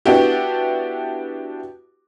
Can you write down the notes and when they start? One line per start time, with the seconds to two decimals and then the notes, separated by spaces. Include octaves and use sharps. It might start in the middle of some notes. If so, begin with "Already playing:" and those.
0.06 B3 D4 E4 F#4 G4